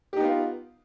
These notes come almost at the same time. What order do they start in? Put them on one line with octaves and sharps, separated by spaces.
G4 D#4 B3 F4